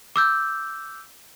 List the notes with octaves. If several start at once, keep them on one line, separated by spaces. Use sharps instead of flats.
D6 E6 G6